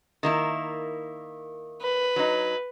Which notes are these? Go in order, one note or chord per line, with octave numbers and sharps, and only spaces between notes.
D#3 A#3 E4
B4
F#3 D#4